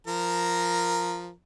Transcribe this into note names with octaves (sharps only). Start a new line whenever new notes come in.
F3 A#4 A#5